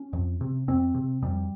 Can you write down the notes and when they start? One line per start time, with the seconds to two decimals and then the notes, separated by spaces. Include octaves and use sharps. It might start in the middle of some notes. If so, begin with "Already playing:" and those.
Already playing: C#4
0.13 F2
0.41 C3
0.68 F2 C4
0.94 C3
1.22 F2 G3